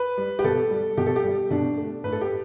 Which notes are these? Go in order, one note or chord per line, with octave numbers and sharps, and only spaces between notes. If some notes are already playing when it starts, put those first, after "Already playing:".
Already playing: B4
G3
G4
B2 A4
G3
B2 G4
A4
G4
G3
B2 D4
A3
A2 B4
A4
G4